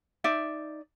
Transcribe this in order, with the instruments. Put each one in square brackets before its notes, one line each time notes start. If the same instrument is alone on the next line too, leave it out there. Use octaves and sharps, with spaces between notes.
[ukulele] D#4 D5 E5